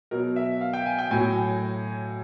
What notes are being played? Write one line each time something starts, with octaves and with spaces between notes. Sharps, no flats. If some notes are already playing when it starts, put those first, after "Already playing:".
B2 F#3 A#4
E5
F5
G5
G#5
G5
A2 F#3 G#5